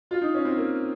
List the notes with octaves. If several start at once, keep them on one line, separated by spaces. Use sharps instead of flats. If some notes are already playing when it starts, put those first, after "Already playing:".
F4
D#4
C#4
C4
A#3